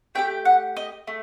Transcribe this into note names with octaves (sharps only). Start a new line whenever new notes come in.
A3 E4 G4 G5
F#5
D#5
A3